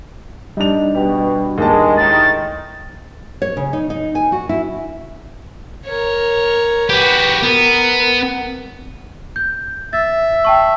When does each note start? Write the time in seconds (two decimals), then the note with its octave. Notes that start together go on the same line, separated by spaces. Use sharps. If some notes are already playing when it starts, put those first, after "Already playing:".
0.57 G3 D4 D#4 F7
0.95 B2 G4
1.58 D#2 G#3 A5
1.97 A2 D#3 A6
3.42 C#5
3.57 C#3
3.73 D#4
3.90 D#4
4.15 G#5
4.32 F#4
4.49 E4
5.86 A#4 C#5
6.89 F#4 G4 B4
7.43 B3 A#4
9.36 G6
9.93 E5 A6
10.45 G5 A5 C#6